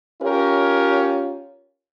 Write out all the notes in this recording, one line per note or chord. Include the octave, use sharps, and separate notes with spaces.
C#4 F4 G4 A#4 C#5